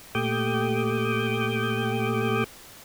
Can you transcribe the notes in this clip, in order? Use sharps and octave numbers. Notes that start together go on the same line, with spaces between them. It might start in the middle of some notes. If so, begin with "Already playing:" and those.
A#2 A3 G4 D6 D#6 G6